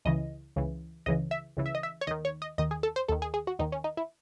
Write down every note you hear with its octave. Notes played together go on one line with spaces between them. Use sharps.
C#2 C#3 E3 D#5
C#2 C#3 E3
C#2 C#3 E3 D#5
E5
C#2 C#3 E3
E5
D#5
E5
C#5
D#2 D#3 D#5
C#5
D#5
D#2 D#3 D#5
G#4
A4
C5
D#2 D#3 A4
G#4
G#4
F#4
D#2 D#3 D#4
C#4
D#4
E4